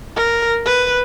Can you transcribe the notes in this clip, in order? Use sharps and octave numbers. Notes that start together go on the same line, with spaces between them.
A#4
B4